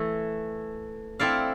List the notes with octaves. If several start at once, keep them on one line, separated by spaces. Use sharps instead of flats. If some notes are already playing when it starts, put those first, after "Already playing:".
Already playing: E3 A3 E4 A4
C4 E4 A4 D5 F5